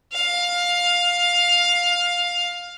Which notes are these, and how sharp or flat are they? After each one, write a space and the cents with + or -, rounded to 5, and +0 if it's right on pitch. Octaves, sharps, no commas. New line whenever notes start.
F5 +15